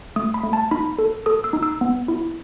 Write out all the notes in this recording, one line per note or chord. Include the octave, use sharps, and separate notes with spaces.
A3 D#6
B5
A3
A5
D#4 B5
A4
A4 D#6
E6
D#4
E6
B3
E4